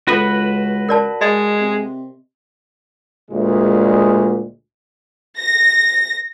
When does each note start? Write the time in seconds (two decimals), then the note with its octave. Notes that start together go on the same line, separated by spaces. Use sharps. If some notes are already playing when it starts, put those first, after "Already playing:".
0.08 C#2 F4 F#4 A4 B4
0.89 A#4 D5 A5
1.21 G#3 D#5
1.60 C3
3.30 D2 A#2 G#3
5.40 A#6